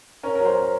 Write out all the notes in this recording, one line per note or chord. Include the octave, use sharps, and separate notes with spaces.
C#4 A#4
F#3 A#4
C5
C#4